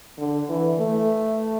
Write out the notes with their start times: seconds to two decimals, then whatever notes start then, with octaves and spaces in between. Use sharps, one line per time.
0.18 D3
0.49 E3
0.80 A3